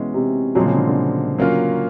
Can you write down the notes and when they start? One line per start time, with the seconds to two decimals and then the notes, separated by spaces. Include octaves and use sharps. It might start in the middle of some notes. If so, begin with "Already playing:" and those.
Already playing: B2 E3 G#3 C#4 F#4
0.14 C3
0.55 A#2 F3 F#3 G#3 C4
0.66 C#3
0.76 D3
0.87 D3
1.38 F#3 A#3 C#4 F4